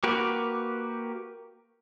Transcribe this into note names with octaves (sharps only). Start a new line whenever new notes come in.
A#3 F#4 G4 B4